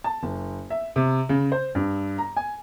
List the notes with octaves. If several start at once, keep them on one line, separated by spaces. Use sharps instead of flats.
A5
F#1
E5
C3
C#3
C5
G2
A#5
G#5